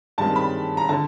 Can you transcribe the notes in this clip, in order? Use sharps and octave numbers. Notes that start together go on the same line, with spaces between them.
G2 D#3 G#3 C4 A5
B5
A#5
D3 A5